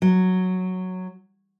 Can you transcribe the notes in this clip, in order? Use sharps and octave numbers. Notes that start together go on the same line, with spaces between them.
F#3